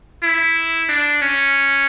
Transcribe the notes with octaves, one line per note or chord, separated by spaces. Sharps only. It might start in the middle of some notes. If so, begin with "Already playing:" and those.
E4
D4
C#4